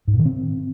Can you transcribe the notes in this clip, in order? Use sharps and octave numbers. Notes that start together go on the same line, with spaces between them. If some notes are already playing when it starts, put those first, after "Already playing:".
G#2
A#2
D#3
C4